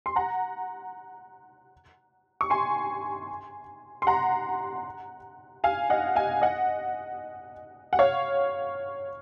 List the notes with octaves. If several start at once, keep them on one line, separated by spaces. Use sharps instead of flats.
C6
F#5 A#5
C#6
G#5 C6
C6
F#5 A#5
F5 G#5
D#5 F#5
F5 G#5
D#5 F#5
F#5
C#5 F5